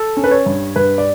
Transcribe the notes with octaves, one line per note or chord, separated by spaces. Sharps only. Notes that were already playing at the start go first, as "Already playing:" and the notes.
Already playing: A4
C#4
B4
C#5
G2
G2 B4
D5